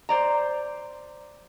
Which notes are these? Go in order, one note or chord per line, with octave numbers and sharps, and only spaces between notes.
C5 D5 A#5